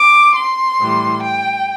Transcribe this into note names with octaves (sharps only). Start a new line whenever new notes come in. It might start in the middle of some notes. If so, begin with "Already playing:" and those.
Already playing: D6
C6
A2 E3 G3
G5